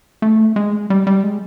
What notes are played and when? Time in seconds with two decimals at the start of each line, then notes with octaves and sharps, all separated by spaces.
0.22 A3
0.56 G#3
0.90 G3
1.07 G3
1.23 G#3